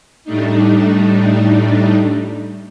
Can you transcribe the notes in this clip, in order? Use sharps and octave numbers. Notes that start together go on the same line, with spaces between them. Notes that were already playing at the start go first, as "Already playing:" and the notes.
A2 G3 A3 D4 D#4